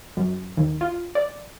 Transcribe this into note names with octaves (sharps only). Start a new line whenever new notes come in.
F#2
D#2
F4
D5